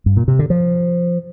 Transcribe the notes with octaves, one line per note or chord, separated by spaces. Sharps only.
G2
A#2
C3
D3
F3